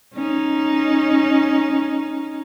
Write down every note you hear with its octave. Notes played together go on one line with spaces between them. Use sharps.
C#4 D#4